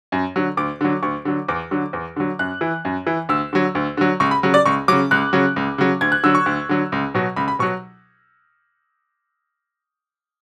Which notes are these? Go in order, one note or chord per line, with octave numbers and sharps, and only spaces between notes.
F#2
D3 F#3
D2 D6
D3 F#3
D2 C#6
D3 F#3
E2 D6
D3 F#3
E2
D3 F#3
F#2 F#6
E3
F#2
E3
D2 E6
D3 F#3
D2
D3 F#3
C#2 C#6
B5
C#3 F#3
D5
C#2 C#6
C#3 F#3 D6
C#2 F#6
C#3 F#3
C#2
C#3 F#3
D2 G#6
F#6
D3 F#3 E6
C#6
D2
D3 F#3
C#2
B2 F#3
C#2 B5
B5
B2 F#3 C#6